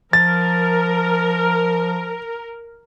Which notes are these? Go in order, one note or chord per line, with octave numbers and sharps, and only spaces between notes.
F3 A#4 A6